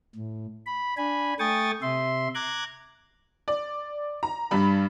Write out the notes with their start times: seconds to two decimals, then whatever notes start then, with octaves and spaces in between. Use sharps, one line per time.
0.15 A2
0.67 B5
0.97 D4 G#5 B5
1.39 A3 G5 G#5 C#6 D#6 A6
1.82 C3 E5 C6
2.35 A#5 D6 F#6 G#6
3.48 D5
4.23 A#5
4.51 G2 G3 B5